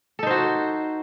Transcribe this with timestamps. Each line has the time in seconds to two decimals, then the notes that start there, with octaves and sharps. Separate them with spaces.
0.19 A4
0.23 D#4
0.27 C5
0.31 F#4